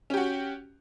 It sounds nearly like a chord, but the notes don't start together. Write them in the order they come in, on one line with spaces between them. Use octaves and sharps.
C#4 G4 F#4